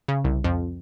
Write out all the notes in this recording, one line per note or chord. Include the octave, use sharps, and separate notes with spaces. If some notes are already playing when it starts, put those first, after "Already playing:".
C#3
C2
F2